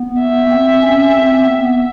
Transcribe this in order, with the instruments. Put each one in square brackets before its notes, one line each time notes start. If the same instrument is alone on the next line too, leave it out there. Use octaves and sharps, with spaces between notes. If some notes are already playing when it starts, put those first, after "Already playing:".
Already playing: [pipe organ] B3
[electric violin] E5
[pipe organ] C4
C#4
C4
B3